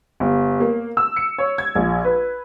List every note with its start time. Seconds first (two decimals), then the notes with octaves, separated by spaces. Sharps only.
0.20 G1
0.60 A#3
0.97 E6
1.16 C#7
1.38 C#5
1.58 G#6
1.75 A#1
2.05 B4